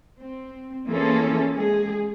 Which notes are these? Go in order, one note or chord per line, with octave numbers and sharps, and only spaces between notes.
C4
E3 A#3 C#4 F4 G#4 A4
G#3 G#4